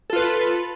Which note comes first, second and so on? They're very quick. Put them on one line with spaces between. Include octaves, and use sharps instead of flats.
A4 F4 B4